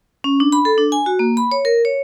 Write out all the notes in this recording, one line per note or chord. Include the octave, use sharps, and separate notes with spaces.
C#4
D4
B5
A4
D4
G#5
F#4
A#3
B5
C#5
A#4
C#5